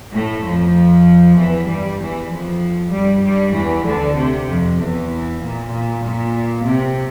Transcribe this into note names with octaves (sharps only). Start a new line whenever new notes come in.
A2 A3
F2 F3
E2 E3
G2 G3
E2 E3
F2 F3
G2 G3
G2 G3
E2 E3
D2 D3
C3
F2
E2 E3
A#2
A#2
A#2
C3